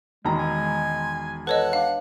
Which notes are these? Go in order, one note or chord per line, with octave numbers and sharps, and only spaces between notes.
E1 D#3 G#3 A#5
G#5
A4 B4 C#5 D#5 F#5
D4 F5